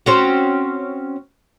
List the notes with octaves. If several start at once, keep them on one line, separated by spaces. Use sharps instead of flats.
C4 C#4 F#4